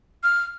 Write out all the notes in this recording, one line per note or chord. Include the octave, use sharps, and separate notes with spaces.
F6